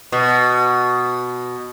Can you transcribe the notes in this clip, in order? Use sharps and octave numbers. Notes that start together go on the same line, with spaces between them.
B2